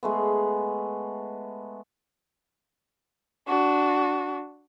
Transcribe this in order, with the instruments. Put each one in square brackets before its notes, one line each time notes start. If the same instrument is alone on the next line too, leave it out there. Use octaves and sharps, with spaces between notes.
[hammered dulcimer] G#3 A3 B3
[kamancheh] D4 F#4